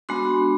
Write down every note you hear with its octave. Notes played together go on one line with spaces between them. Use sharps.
G#3 B3 D4 F#4 C6